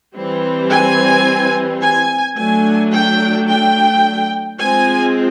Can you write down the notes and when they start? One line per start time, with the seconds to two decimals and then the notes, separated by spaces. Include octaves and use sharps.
0.15 E3 G3 C4
0.70 G#5
1.82 G#5
2.37 F#3 A3 D4 G#5
2.93 G5
3.48 G5
4.59 F3 G#3 C4 G#5